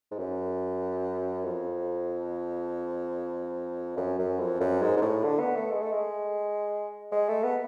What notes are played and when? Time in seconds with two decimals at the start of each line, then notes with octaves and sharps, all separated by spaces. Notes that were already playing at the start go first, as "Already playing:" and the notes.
0.11 G#2
0.19 F#2
1.45 F2
3.97 F#2
4.19 F#2
4.40 F2
4.60 F#2
4.82 G#2
4.97 G#2
5.02 A2
5.24 D3
5.40 B3
5.56 A3
5.71 G#3
5.82 A3
5.92 G#3
7.12 G#3
7.29 A3
7.44 B3